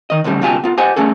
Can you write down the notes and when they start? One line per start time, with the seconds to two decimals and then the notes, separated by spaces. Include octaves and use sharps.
0.10 D#3 D#5
0.24 D2 A2 C#3 G3
0.41 C#2 B2 F4 G4 G#5 A5
0.64 B3 F4
0.77 G4 C5 D#5 F#5 G#5
0.96 A3 C#4 G#4 A4